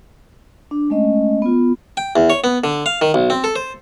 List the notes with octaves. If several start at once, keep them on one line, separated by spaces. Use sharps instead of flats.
D4
G#3 A3 C#4 D#5
B3 F4
G5
E2
C#5
B3
D3
F5
D#3
B1
C4
A4
C5